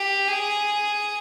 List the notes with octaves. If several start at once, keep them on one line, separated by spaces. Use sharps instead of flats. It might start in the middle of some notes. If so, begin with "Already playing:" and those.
Already playing: G4
G#4